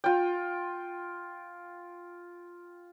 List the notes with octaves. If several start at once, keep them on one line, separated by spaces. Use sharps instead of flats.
F4 G5